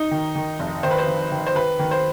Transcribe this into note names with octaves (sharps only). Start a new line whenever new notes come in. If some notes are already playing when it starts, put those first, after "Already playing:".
Already playing: D#4
D#3
D#3
F1
D#3 C5
B4
C5
D#3
D#3
C5
D#3 B4
D#3
C5